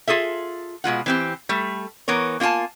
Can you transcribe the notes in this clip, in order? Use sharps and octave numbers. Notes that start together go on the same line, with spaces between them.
F4 G#4 A4 E5
B2 G#3 F4 F#5
E3 C4 G4
G3 A3
E3 B3 A#4 C#5
A#3 F4 G4 G#5 A5